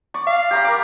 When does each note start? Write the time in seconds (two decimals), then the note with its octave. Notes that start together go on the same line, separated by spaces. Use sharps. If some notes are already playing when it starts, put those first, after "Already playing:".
0.14 D5 C#6
0.27 F5
0.51 G4 A#5 B5
0.65 A#4 D6